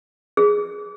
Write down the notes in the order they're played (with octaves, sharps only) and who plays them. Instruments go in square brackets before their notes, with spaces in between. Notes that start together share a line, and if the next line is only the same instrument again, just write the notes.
[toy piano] G#4